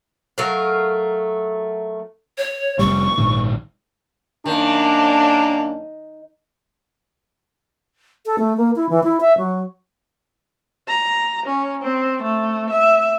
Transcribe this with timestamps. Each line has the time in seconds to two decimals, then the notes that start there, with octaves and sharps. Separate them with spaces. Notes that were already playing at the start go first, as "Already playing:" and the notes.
0.38 F#3 A3 A#4 F5
2.38 C#5
2.79 F1 C2 G3 C#6
3.18 A#1 G#2 D#3
4.46 F#2 D#3 A#3 D4
8.26 A4
8.38 A3
8.57 A#3
8.76 E4
8.89 E3
9.03 E4
9.21 E5
9.38 F#3
10.88 A#5
11.46 C#4
11.82 C4
12.23 A3
12.70 E5